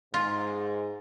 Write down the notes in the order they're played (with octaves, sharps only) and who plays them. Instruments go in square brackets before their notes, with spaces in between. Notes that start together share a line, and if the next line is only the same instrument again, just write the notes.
[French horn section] G#2 [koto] F4